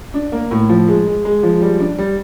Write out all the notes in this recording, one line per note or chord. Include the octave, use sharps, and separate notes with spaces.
D4
A#3
A2
F3
G#3
G#3
G#3
F3
G3
D4
G3